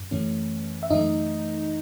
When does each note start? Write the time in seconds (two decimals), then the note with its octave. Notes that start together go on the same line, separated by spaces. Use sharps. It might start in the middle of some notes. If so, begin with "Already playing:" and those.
Already playing: F#2
0.11 F#2 E3 A3 C#4
0.83 E5
0.90 F#2 E3 A3 D#4 D#5